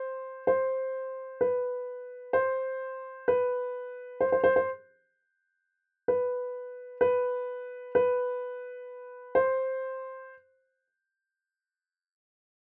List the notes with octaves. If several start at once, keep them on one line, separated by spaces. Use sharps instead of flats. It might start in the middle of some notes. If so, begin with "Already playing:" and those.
Already playing: C5
C5
B4
C5
B4
C5
C5
C5
C5
B4
B4
B4
C5